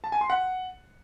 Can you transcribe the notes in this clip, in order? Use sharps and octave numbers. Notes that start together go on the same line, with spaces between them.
A5
G#5
C6
F#5